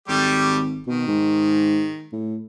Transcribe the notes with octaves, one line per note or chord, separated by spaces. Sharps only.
G#1 G3 A3 G4
B2 D#3
G#2
A2